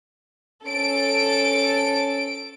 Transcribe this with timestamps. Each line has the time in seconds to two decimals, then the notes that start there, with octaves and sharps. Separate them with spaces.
0.64 C#4 A4 D7